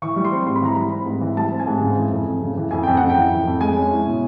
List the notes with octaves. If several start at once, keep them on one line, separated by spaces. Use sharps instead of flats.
E3 C#6
G3
C6
C4
G#2 C6
B5
E3 A#5
G3 B5
C4
G#2
E3
G3 A5
C4
G#5
G#2
C#3
E3
F2
F2
C#3
E3
F2 G#5
F2 G5
C#3 F#5
G5
E3
F2
F2
G#3 G#5
C#4
E4
B2